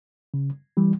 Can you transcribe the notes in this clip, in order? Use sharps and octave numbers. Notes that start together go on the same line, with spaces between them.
C#3
E3 G3